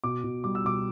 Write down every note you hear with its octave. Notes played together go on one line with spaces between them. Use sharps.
B2 D6
B2
G3 D6
E6
B2 D6